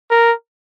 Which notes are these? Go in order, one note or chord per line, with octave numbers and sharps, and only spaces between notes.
A#4